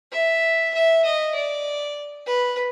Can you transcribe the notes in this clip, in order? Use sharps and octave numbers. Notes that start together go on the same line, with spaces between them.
E5
E5
D#5
D5
B4